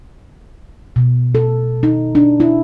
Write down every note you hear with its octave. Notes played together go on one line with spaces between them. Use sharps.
B2
A4
D#4
D4
E4